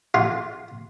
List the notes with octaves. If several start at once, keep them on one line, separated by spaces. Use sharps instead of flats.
F4